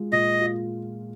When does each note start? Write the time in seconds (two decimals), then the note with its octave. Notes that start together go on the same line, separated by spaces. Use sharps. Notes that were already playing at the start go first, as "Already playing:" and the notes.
Already playing: G#3 F4
0.12 A#2 D#5
0.40 F4